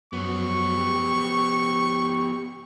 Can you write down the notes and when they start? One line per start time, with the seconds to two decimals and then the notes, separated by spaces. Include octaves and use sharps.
0.13 F#2 F3 B3 C#6
0.78 G4